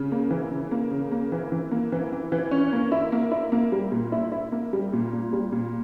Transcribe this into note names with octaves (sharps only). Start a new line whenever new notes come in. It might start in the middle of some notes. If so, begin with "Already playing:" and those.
Already playing: C#3
A#3
E3
C#3
A#3
C#3
A#3
E3
E3
A#3
E3
E3
E3
C#4
A#3
E4
A#3
E4
A#3
G3
A#2
E4
E4
A#3
G3
A#2
A#2
G3
A#2